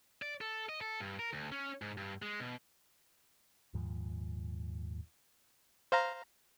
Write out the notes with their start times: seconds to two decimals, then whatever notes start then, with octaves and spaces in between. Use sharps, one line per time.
0.22 D5
0.41 A4
0.69 D#5
0.81 A4
1.00 G2
1.19 A#4
1.33 D2
1.52 C#4
1.82 G#2
1.97 G2
2.22 G#3
2.40 B2
3.74 D#1 D#2 G#2 F3
5.92 C5 F5 A#5